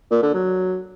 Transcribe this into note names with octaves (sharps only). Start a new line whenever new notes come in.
A#2
D3
F#3